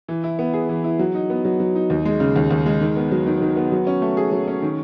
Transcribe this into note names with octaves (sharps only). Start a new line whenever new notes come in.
E3
E4
B3
G#4
E3
E4
F#3
D#4
B3
F#3
F#3
D#4
D#2
G#3
C#3
D#2
D#2
G#3
D#3
B3
F#3
D#3
D#3
B3
F#3
C#4
A3
G#4
F#3
C#4
D#3